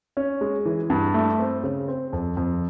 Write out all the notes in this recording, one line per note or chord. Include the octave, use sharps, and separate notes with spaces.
C#4
G#3
E3
G2
A3
C4
C#3
C4
F2
F2